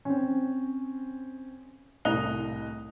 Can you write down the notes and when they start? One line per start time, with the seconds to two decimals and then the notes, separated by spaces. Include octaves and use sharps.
0.05 C4 C#4
2.05 C2 A2 D#5 F#6 F7 G7